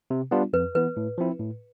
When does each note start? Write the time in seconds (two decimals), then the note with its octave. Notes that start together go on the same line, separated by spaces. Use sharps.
0.10 C3
0.31 G3 B3 D4 F4
0.53 F2 B4
0.75 E3 B3 B4
0.97 A2
1.18 F3 C4 E4
1.40 A2